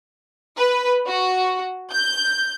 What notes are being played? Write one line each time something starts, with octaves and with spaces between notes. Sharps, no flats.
B4
F#4
G6